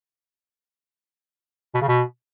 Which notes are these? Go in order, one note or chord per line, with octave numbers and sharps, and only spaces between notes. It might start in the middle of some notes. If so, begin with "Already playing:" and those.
B2
C#3
B2